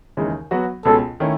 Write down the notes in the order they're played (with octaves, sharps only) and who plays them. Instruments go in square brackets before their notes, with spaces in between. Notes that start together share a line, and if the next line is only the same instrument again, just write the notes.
[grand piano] D#2 C#3 E3 G#3 D#4
F#3 B3 F#4
[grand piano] C#2 B2 G#3 C#4 [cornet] A4
[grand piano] D#3 A3 C#4 E4